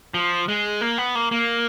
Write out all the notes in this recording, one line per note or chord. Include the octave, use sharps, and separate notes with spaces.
F3
G#3
A#3
B3
A#3
A#3